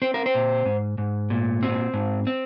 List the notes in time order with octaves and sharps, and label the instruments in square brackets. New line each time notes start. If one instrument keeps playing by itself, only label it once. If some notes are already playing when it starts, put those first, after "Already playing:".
[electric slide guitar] C4 C5
A#4
C5
A#2
G#2
G#2
A#2
C4
G#2
C4